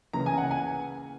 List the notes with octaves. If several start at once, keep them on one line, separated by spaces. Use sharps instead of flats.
C#3 E3 A#3 A#5
G#5
F#5
G#5